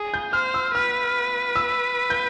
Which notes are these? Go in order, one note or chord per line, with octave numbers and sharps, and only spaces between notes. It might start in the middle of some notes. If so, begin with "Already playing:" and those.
Already playing: G#4
G6
C5 F6
E6
B4 F6
E6
G6